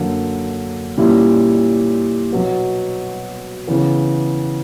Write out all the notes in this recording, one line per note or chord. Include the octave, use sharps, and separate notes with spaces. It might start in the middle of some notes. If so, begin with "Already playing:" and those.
Already playing: F#2 D3 A#3
A#2 G3 C#4 E4
B2 F#3 B3
C#3 E3 B3